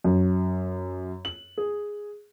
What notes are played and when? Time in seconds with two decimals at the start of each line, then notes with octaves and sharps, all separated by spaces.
0.04 F#2
1.25 F#7
1.58 G#4